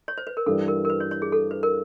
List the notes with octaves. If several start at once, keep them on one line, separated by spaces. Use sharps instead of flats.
C#5
C5
B4
A#4
G2 E3 G3 A4
A#4
A#4
B4
C#5
C#5
G#4
A4
B4
A#4